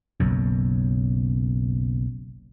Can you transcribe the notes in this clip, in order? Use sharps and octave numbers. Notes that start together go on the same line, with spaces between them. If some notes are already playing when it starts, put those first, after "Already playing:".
F#1 B1 F#2